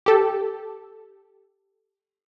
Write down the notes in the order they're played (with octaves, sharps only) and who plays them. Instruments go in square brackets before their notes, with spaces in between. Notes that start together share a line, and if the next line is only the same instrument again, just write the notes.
[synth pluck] G4 A4